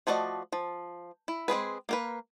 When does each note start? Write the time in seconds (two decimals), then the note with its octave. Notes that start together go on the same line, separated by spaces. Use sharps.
0.07 F3 A3 F#4 D5 D#5
0.52 F3
1.28 E4
1.48 G#3 C4 G#4 B4
1.89 A#3 A#4 B4